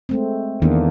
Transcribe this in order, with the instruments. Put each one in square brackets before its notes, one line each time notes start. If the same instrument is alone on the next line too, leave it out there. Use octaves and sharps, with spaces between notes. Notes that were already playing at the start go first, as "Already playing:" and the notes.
[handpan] G#3 A3 C4
[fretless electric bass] E2 [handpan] D#3 A#3 D4